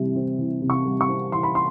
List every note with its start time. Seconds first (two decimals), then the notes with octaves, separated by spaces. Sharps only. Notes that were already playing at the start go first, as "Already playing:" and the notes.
Already playing: C3 E3 G3
0.16 C4
0.39 E3
0.62 C3
0.70 C#6
0.85 G3
1.01 C#6
1.09 C4
1.32 E3 C6
1.43 B5
1.55 C6